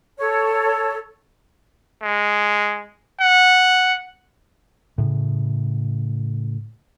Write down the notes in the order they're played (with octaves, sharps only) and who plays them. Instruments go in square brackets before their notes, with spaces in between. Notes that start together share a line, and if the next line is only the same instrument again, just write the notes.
[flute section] A4 C#5
[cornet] G#3
F#5
[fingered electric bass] A2 C#3